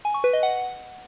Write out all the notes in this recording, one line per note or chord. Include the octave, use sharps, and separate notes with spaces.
G#5
C#6
B4
D#5
F#5